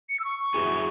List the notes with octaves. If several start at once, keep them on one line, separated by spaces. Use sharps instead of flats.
C#7
E6
C#6
C#6
F#2 F#3 E4 G#4